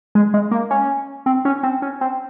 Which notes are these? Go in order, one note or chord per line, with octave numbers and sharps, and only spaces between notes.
G#3
G#3
A#3
C#4
C4
C#4
C4
C#4
C4